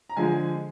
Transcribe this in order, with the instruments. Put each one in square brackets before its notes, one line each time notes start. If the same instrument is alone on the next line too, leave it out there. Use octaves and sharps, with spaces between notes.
[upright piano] A#5
D3 F3 G#3 G#5